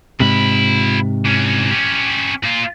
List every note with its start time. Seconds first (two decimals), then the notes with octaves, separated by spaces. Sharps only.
0.20 G#2 C3 F4 B5
1.26 E3 C#4
1.71 C#4 G4
2.43 A#2 F4